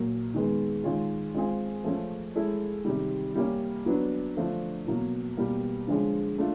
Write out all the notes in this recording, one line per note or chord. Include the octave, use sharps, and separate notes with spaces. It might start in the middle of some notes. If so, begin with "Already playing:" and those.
Already playing: A#2 F#3 A#3
D#3 G#3 B3
D#3 G#3 C#4 F4
G#3 C4 F4 G#4
F3 A3 C#4
G#3 C#4 E4 A4
C3 D#3 G3
G3 A#3 C#4
F#3 B3 D4
D3 F3 A3 D4
B2 F#3 A#3
B2 G3 A#3
D3 F3 G#3 C#4
A3 D4 F4